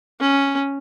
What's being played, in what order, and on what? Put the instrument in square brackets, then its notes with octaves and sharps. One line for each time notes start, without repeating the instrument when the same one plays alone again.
[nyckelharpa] C#4